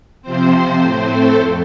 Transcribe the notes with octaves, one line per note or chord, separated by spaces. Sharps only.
C3 F3 C4 C5
A2 A3 C4 C5
A4
F2